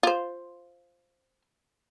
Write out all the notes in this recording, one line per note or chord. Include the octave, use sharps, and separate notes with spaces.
F4 C5